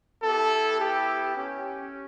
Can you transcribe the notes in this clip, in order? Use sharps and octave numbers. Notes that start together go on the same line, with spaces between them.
B3 E4 G4 A4
G4
C#4 G4